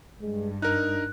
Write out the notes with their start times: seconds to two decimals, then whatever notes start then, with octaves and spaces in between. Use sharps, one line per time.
0.21 G2 G#3
0.62 D4 D#4 A#4 F#6